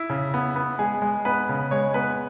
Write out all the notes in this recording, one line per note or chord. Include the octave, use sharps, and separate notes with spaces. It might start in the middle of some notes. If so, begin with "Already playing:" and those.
Already playing: E4
C#3
B3
B3
G#3 G#4
G#3
B3 B4
C#3
G#3 C#5
B3 B4